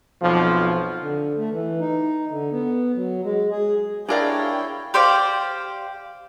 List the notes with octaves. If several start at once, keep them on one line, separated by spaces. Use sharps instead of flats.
B1 F2 F3
D3
A3
E3
D#4
D3
B3
F#3
G#3
G#4
D4 E4 G#4 A#4 C#5 D5 F5 G5
G4 C5 D5 F5